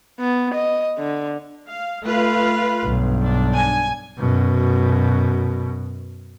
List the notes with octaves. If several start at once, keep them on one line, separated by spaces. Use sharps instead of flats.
B3
D#5
D3
F5
A3 F4 B4 F5
B1 G2
D4
G#5
F#2 B2